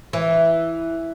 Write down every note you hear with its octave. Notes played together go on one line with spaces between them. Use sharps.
E3